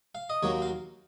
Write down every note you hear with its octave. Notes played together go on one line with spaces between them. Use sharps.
F5
D#5
D#2 D#3 F#3 A#3 C#5
F5